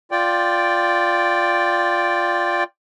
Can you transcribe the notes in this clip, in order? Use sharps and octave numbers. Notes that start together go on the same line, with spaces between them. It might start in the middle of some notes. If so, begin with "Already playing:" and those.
F4 D5 G5